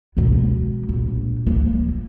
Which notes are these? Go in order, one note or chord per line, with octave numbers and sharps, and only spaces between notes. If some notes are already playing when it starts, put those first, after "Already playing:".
B2 G#3
A#1
F3 A#3